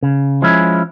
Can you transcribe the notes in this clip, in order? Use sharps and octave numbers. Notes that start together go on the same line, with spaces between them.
C#3
F3 G#3 C#4 E4